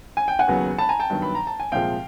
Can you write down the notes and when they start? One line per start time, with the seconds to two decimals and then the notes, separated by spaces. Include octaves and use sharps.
0.17 G#5
0.28 G5
0.39 F#5 G#5
0.47 D#2 C#3 F#3 B3
0.79 A5 B5
0.89 G#5 A#5
0.99 G5 A5
1.10 G2 D#3 F#3 B3
1.22 B5
1.35 A#5
1.47 A5
1.60 G#5
1.72 C2 A#2 F3 G#3 F5 G5